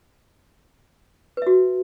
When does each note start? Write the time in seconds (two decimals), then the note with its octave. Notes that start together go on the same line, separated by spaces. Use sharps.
1.37 B4
1.42 E5
1.47 F#4